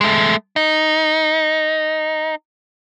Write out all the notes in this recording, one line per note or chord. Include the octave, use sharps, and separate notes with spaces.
G#3 A3
D#4